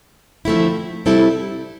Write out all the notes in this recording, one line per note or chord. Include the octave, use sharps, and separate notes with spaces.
D3 F3 A3 C4 E4
C3 G3 C4 E4 A4